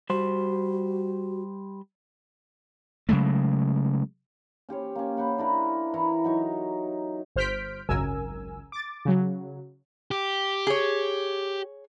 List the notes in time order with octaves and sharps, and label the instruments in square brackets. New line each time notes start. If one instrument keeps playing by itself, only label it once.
[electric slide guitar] G3 C5 [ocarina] F#4
[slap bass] C#3 F#3 G#3 A3
[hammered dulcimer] C#4 G4 C5 C#5
A#3 C#4
C5 F#5 B5
D4 E4 A#4
E3 E4 A#5 C#6
F#3 D#4 C#6
[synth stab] G1 C5 F6 G6 B6 D7
G#1 C#2 F#2 A#4 G#5 E6
D6 A6
C#3 F#3
[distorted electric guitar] G4
[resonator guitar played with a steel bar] G#4 C#5